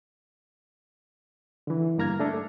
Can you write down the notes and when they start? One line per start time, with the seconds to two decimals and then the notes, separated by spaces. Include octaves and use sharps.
1.67 D3 E3
1.98 G2 A#3 A#5 F6 G#6
2.20 A3 D4 A4